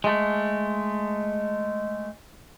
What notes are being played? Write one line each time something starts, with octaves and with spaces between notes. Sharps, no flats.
G#3 A3